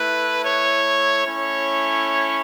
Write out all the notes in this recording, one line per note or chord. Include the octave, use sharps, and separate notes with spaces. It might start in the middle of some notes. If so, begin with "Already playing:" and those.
Already playing: A3 E4 B4
C#5
A3 C#4 E4 C#5